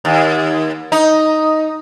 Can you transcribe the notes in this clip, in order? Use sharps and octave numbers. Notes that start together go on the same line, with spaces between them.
D#2
D#4